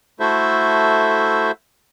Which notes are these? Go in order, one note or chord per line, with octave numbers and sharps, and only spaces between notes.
A3 E4 F#4 A4 C5 E5